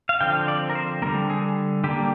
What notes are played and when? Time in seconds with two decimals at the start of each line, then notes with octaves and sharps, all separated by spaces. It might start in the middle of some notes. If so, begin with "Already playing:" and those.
0.09 F5
0.21 D3 F3 C4 G5
0.48 D5
0.70 A#4
0.75 C5
1.02 D3 G3 A#3 A#4
1.30 G#4
1.84 D3 G3 A#3 G4